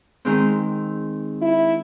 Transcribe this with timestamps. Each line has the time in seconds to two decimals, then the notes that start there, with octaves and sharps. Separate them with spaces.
0.25 D#3 G#3 C4
1.42 E4